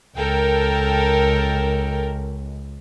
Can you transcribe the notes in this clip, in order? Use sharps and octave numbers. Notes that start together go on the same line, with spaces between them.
C#2 A4 A#4 G5